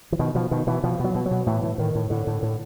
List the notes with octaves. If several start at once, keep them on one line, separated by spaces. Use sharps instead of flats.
E3
B2 D#3
B2 F3
B2 D#3
B2 E3
B2 F3
B2 F#3
B2
F#3
B2
A2 E3
A2
A2 D#3
A2
A2 D3
A2
A2